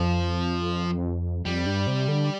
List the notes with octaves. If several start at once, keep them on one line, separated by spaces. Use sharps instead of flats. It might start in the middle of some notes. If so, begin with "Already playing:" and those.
Already playing: F2 F3
F2 G3
G2
C3
D3